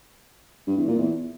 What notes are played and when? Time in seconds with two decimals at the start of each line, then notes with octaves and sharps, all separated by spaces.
0.67 G2
0.77 E2
0.88 A#2
0.98 E2